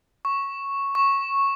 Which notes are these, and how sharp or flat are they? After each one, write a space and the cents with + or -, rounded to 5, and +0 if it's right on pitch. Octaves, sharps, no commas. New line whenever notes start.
C#6 -5
C#6 -10